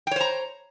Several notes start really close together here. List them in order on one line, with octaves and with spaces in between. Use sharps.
G5 C#5 C5 A#5